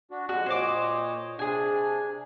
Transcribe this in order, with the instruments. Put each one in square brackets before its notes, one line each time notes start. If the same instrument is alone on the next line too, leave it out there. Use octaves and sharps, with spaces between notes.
[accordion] D4 F#4
[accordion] F2 G#3 [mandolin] F#4
[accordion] A#2 C#5 D#5 [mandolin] C5 D6
[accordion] C3 D4 [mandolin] G#4 G#5